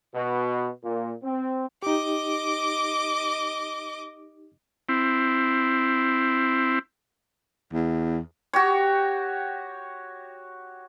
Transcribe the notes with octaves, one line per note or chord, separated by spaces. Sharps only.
B2
A#2
C4
D#4 G4 D#5 D6
C4 E4
E2
F#4 G4 C#5